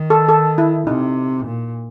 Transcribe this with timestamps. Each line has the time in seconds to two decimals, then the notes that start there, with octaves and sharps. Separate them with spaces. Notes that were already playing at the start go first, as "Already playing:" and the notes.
Already playing: D#3
0.10 A4
0.29 A4
0.58 E4
0.87 C3 D#4
1.46 A#2